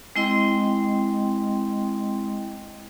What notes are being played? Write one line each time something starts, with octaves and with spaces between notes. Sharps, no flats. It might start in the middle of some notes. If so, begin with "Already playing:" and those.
G#3 C4 E4 D#5 G5 C6